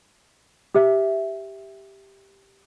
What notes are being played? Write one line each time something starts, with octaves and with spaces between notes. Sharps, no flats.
G4 E5